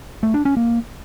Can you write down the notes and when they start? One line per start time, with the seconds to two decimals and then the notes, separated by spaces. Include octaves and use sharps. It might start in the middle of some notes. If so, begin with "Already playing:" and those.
0.23 A3
0.34 D4
0.45 C#4
0.57 A#3